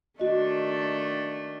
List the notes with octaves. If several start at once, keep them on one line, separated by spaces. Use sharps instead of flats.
D#3 A3 D4 F#4 D#5